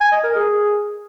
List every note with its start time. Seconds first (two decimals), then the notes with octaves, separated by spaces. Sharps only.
0.01 G#5
0.12 D#5
0.24 A#4
0.35 G#4